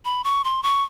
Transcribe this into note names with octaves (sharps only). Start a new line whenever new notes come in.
B5
C#6
C6
C#6